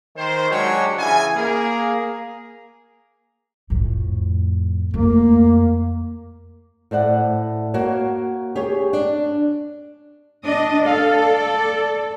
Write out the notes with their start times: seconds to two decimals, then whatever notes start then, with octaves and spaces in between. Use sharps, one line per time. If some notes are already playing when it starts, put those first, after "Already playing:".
0.16 D#3 C5
0.51 F#3 G#3 D4 F#4 G4 C#5
0.98 C#3 E3 E4 G#5
1.35 A#3 G#4 A#4
3.70 F2 A2
4.94 F2 A3 A#3
6.91 A2 C5 D5 F#5
7.74 A#3 F#4 C#5
8.55 G4 G#4 C#5
8.93 D4
10.46 D4 D#5
10.86 A4 F5
11.21 D5